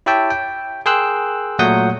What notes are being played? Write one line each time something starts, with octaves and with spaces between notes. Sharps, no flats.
E4 G4 C#5 E5 G5 A5
G5
G#4 A#4 G5 C6 E6 F#6
A#2 F#3 A3 F#5 D#6 G6